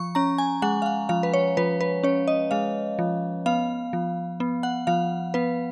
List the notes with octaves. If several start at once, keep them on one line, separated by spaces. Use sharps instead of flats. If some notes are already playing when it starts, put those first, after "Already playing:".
Already playing: F3 C#6
C#4 A#5
G#5
G#3 F#5
F5
F#5
F3 F5
B4
C#5
F3 B4
B4
C#4 C#5
D#5
G#3 F5
F3
B3 F5
F3
B3
F#5
F3 F5
B3 B4